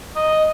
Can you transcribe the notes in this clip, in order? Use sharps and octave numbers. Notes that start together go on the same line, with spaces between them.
D#5